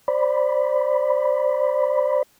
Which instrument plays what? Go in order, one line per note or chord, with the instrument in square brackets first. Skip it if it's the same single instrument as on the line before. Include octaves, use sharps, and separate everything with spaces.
[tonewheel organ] C5 D5 B5